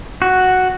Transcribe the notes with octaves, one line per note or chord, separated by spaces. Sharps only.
F#4